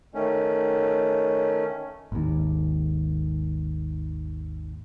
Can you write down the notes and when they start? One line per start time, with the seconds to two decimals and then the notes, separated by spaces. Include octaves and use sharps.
0.14 D#3 A3 C#4
2.12 G#1 D#2